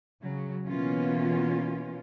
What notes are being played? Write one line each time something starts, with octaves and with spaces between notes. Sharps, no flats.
C#3 F#3
B2 E3 A#3 B3 C#4 F4